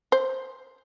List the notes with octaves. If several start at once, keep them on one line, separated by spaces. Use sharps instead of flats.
C5